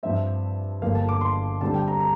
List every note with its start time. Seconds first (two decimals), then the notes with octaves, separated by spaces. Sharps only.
0.03 G2 F3 C4 E5
0.82 G1 G2 F3 A#3 F5
0.95 A5
1.09 D6
1.21 C6
1.61 D2 D3 G3 C4 A5
1.74 G5
1.88 A#5
2.00 A#5